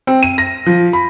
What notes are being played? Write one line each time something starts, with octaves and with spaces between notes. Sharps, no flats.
C4
D#7
A#6
F3
B5